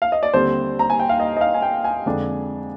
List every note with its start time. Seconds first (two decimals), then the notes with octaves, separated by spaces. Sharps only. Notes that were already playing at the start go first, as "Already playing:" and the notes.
0.02 F5
0.12 D#5
0.23 D5
0.34 D#2 D3 G3 C4 C5
0.79 A#5
0.90 G#5
1.00 G5
1.09 F5
1.20 D#5
1.37 D#5
1.41 F5
1.54 G#5
1.62 G5
1.84 G#5
2.06 F2 D3 G#3 D4